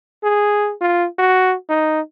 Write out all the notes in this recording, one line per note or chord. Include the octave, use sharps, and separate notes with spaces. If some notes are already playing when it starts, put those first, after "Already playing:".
G#4
F4
F#4
D#4